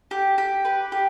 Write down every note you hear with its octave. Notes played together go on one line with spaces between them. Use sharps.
G4
G4
B4
G4